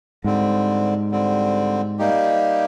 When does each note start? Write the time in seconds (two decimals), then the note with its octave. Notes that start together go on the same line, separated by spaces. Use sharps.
0.24 G#2 D3 G3 C4
1.12 D3 G3 C4
1.99 G3 A#3 D#4 G4